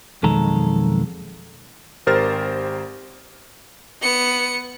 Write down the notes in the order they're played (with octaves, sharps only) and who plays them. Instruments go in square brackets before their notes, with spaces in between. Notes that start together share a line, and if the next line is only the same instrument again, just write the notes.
[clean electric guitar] B1 F2 D#3 G#3 A4 A#5
[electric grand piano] G#1 G4 A#4 C5 F6 A6
[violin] B3 C#7